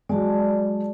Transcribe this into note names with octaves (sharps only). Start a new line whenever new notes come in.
F#3 G#3 D5 A5